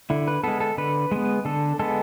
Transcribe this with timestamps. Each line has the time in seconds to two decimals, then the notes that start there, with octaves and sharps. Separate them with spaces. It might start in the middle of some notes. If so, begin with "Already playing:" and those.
0.10 D3 E4
0.27 B4
0.44 G#3 B3 A4
0.60 A4
0.78 D3 B4
1.11 G#3 B3
1.45 D3 A4
1.79 G#3 B3 A4